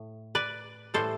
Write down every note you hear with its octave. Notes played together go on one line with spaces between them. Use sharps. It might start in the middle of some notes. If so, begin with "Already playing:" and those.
Already playing: A2
B4 D5
A2 E3 G3 A4 C5